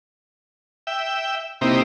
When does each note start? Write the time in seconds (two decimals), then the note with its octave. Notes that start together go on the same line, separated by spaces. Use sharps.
0.87 E5 G5
1.61 C3 A#3 C4 D#4 E4 G4